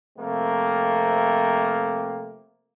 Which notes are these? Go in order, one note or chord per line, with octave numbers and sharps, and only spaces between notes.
C3 F3 A3 A#3 C4